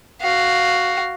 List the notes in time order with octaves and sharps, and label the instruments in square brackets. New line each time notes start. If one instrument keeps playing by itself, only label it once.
[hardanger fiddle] F#4 F5